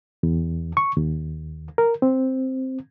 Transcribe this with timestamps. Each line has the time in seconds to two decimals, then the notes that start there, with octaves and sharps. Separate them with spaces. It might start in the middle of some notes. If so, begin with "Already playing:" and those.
0.23 E2
0.77 C#6
0.97 D#2
1.78 A#4
2.02 C4